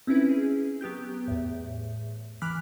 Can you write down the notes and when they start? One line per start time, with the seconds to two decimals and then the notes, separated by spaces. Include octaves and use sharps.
0.07 C4 C#4 D#4 E4 B4
0.29 G#4
0.81 F#3 B3 G4 G6
1.28 E2 A2
2.42 E3 B5 D6 F6 F#6 B6